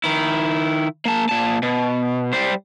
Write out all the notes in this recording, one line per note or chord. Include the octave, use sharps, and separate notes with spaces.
D#3 E4
A#3 A5
A#2 A5
B2
G3 C5